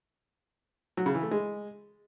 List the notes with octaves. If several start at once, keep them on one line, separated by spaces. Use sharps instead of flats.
F#3
C#3
E3
A3
G#3